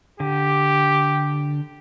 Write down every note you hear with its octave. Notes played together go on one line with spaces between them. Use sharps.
D3 G4